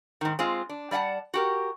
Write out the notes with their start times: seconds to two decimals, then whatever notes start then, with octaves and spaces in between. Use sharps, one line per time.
0.21 G#2 D#3
0.39 G#3 C4 F4
0.69 D4
0.91 G3 D5 E5 F#5 A5
1.34 F#4 G4 A#4